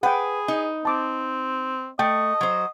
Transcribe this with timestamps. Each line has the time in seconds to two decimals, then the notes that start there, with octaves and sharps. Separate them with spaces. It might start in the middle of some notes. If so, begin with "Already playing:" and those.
0.03 G#4 B4 F#5 G5
0.48 D#4
0.85 C4 A5 D6
1.99 A3 D#5 G5
2.41 F#3 C5